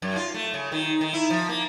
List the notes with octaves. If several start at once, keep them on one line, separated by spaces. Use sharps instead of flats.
F#2
F4
A3
C#3
D#3
D#3
E4
F3
A#3